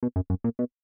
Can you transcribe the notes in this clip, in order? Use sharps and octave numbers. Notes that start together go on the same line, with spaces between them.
B2
F#2
F#2
A#2
B2